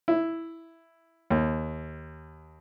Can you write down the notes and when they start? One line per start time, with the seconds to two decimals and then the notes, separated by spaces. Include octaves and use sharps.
0.08 E4
1.30 D#2